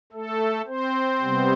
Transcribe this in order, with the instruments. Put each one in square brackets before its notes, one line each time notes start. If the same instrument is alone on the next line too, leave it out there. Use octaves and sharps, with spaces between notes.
[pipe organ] A3 A4
C4 C5
C3 G3 B3